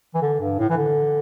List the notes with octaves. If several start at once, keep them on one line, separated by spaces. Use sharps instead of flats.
E3
D3
G2
A2
E3
D3